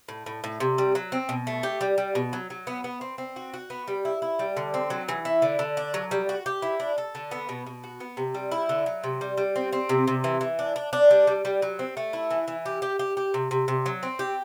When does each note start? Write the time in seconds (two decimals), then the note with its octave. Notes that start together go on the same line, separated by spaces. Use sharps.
0.09 A2
0.26 A2
0.44 A2
0.60 C3
0.78 G3
0.95 F#3
1.12 C4
1.29 B2
1.47 A3
1.63 G4
1.81 G3
1.98 G3
2.15 B2
2.33 F#3
2.50 F#3
2.67 B3
2.84 B3
3.01 C4
3.18 C4
3.36 F#4
3.54 F#4
3.70 B3
3.88 G3
4.05 E4
4.22 E4
4.39 G3
4.57 D3
4.74 C4
4.90 F#3
5.09 E3
5.25 E4
5.42 D3
5.59 D3
5.77 D4
5.94 F#3
6.11 G3
6.29 F#4
6.46 G4
6.62 E4
6.80 D4
6.98 A4
7.15 D3
7.31 B3
7.49 B2
7.67 B2
7.84 F#4
8.00 B3
8.17 C3
8.35 G3
8.51 E4
8.69 D3
8.86 F#3
9.04 C3
9.21 G3
9.37 G3
9.56 C4
9.73 C4
9.89 C3
10.07 C3
10.24 E3
10.41 E3
10.59 D4
10.76 D4
10.93 D4
11.11 G3
11.27 G3
11.45 G3
11.62 F#3
11.79 C4
11.97 A3
12.13 E4
12.31 E3
12.48 E3
12.66 G4
12.82 G4
12.99 G4
13.17 G4
13.34 C3
13.51 C3
13.68 C3
13.86 F#3
14.03 C4
14.19 G4